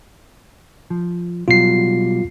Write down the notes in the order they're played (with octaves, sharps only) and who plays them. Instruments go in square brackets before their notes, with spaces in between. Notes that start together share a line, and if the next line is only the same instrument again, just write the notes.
[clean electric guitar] F3
[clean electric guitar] B2 F#3 G3 [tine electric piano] F4 C7